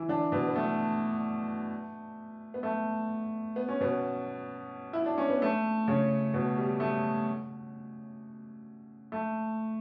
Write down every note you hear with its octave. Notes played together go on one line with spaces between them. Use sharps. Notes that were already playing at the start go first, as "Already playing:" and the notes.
Already playing: E3 E4
D3 D4
B2 B3
B3
A3
B3
A3
B3
C#4
B2 B3
E4
D4
C#4
B3
A3
C#3 C#4
B2 B3
G3
A3
A3